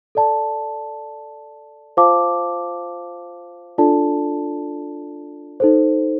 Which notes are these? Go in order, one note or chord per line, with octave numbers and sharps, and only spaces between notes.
A4 D5 A5
F4 C5 F5 A5 D6
D4 F4 A4 D5 A5
D#4 A4 C5